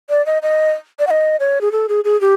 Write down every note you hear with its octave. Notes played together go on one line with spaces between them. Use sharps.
D5
D#5
D#5
D5
F#5
D#5
C#5
G#4
A4
G#4
G#4
G4